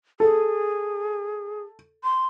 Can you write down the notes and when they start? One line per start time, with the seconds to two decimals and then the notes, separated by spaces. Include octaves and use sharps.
0.20 G#4 A4
2.04 C6